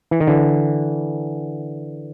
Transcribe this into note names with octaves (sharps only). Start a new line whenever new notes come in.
E3
D#3
D3 E3